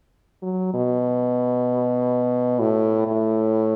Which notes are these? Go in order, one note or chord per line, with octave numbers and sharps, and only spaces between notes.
F#3
B2
A2
A2